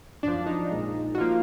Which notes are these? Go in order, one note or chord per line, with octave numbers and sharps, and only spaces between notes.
G#1 F#2 F3 D4
D#4
A#1 A#2 G#3
F#4
F3 A#3 F4